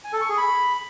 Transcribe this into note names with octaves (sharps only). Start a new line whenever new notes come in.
G#5
A4
C#6
G#4
B5